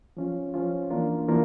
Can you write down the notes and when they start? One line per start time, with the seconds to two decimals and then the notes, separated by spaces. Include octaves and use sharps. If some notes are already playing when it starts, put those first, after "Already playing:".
0.17 F3 C#4 F4
0.54 F3 C#4 F4
0.90 E3 A#3 D4 F4 A#4
1.28 E3 A#3 D4 F4 A#4